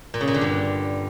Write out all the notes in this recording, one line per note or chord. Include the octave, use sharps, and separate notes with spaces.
A#2
C#3
A#2
D3
G2